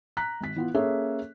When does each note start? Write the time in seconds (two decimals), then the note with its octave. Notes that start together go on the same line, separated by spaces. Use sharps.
0.17 A#5 F#6 B6
0.41 G#1 B6
0.56 E3 B3 F4
0.74 A#3 C#4 G#4 A4 C#5 E5